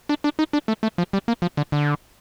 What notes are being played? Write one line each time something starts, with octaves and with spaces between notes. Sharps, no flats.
D4
D4
D#4
D4
A3
A3
F3
G3
A#3
F3
D3
D3